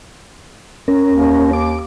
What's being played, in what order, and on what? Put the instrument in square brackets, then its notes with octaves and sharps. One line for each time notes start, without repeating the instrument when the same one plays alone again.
[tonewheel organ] C#4 A#4
[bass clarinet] D#2
[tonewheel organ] D6